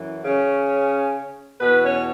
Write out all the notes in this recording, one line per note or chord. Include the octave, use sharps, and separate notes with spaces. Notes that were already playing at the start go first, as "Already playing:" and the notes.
Already playing: F#2 E3
C#3 C#4
E2 B2 B3 B4
C#4 C#5